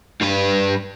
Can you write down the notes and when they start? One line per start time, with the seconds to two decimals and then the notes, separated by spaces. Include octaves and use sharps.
0.21 G2 B4